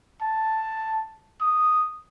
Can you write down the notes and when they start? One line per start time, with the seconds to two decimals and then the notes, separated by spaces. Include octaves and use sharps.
0.22 A5
1.41 D#6